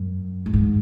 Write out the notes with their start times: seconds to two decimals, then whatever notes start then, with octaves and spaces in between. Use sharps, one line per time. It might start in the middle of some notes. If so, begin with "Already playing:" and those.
Already playing: F#2
0.46 A2
0.53 G#2